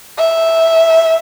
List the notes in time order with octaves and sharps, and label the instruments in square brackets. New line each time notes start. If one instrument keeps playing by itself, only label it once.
[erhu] E5